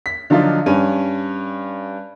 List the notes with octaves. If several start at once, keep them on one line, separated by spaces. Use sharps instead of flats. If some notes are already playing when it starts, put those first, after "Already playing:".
B6
D3 F3 F#3 D#4 F4 D5
G2 C#4 D#7